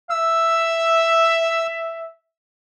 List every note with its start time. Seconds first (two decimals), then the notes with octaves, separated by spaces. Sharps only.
0.10 E5 E6